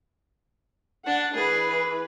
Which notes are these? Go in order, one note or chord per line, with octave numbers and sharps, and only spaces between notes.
D4 F#5
E3 G#4 B4